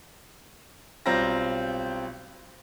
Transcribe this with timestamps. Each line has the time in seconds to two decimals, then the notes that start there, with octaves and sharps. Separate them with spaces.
1.06 B1 G3 C4 F4 A#5 A#6